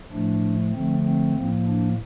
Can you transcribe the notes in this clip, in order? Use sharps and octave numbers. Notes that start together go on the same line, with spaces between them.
A2 F3 A3 D4
D3 F3 A3 C4
C4
A2 F3 A#3
D4